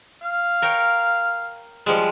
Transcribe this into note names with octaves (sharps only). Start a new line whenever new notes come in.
F5
A#4 C#5 G5
F3 G3 G#3